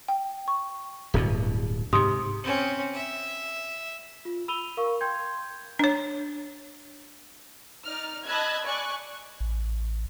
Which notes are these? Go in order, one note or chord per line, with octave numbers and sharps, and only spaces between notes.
G5
C#6
D1 G2 B2
G#2 C3 G4 C6 D#6
C4 C#4
E5
F4
B5 E6 D#7 F7 G7
A#4 F5 C#6
G5 C6 G6 G#6
D4 C#5
D#4 D5 F6
D#5 A5 B5 E6 F#6 G#6
D5 G#5 C#6 F#6
A1